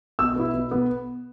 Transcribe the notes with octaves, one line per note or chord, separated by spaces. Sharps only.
B2 E6
B3 E4
B2
B3